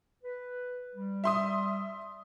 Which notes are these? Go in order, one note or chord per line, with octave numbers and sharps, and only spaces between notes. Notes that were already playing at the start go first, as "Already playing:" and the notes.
B4
G3
E5 C6 D#6